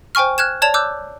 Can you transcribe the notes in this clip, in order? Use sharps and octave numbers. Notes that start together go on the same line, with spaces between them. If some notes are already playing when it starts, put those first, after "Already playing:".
C5 G5 G#5 C#6 F6
F6 F#6 G#6 E7
C#5 D5 A5 G#6 E7 F7
D6 E6 F#6 G6